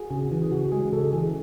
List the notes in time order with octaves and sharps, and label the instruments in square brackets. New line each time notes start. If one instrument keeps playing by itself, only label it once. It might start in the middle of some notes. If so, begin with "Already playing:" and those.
Already playing: [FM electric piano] F#4 G#4
[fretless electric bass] C#3 [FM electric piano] G#4
[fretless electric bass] E3
[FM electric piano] G#4
[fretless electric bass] C#3 [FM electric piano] F#4
[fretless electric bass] G#3 [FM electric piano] G#4
[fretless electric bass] C#3 [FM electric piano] A4
[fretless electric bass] E3 [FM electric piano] G#4